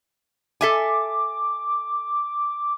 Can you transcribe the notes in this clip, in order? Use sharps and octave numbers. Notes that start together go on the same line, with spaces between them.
A4 E5 G#5 D6